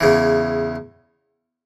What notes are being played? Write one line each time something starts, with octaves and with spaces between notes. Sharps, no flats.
E2 C#3 E3